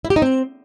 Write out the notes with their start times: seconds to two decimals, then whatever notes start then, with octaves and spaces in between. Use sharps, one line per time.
0.05 E4
0.10 G4
0.16 D#4
0.22 C4